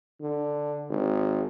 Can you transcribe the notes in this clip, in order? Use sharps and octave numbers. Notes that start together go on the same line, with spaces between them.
D3
G#1